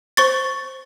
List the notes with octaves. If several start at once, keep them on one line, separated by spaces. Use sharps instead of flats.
C5 C#6 A6